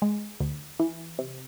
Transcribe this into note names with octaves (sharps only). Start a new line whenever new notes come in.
G#3
D2
E3
C3